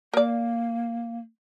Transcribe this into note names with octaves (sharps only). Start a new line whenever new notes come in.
A#3 A#4 D5